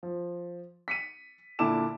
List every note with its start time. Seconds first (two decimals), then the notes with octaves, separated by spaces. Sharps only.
0.03 F3
0.88 B6 C#7 D#7
1.59 A#2 D3 E4 A5 D6 E7